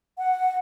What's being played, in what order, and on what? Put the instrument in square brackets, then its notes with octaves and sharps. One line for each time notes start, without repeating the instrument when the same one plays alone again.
[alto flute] F#5